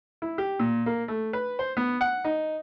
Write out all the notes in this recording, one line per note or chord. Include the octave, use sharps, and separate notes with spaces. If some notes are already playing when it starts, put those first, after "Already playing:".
E4
G4
A#2
A#3
A3
B4
C5
B3
F#5
D#4